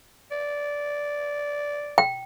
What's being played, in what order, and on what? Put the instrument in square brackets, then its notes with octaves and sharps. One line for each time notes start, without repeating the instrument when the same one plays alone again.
[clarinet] D5
[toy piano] G5